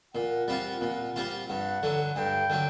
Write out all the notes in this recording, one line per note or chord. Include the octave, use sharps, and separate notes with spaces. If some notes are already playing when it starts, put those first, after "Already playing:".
A#2 F#5
G3 C4 F4
A#2
G3 C4 F4
G2 F#5
D3 F#3
G2 G5
D3 F#3